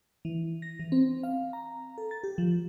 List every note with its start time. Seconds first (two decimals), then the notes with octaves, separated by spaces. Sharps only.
0.25 E3
0.62 A#6
0.80 E3
0.92 C4
1.23 F5
1.53 A#5
1.98 A4
2.11 A6
2.23 G4
2.38 F3